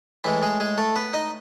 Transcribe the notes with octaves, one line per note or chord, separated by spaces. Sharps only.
A2 E3 G#3 E4
G#3 G#4
G#3 G#4
A3 A4
B3 B4
D#4 D#5